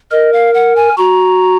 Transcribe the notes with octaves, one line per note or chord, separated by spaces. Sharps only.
A#4 D#5
F5
F#5
G#5
F#4 A#5